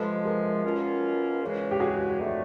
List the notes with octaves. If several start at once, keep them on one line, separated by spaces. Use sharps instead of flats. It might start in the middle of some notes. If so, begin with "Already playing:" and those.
Already playing: C3 F3 G#3 A4 B4
G#4 A#4
B2 F#3 A#3 C#4 F4
E2 C#3 E3 G#3
G4
F#4 G#4
F2 D3 F#3 A3